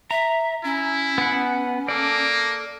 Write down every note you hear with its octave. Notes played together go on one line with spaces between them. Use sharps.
E5 A#5
C#4 E4
B3 F#5
A#3 A4 D5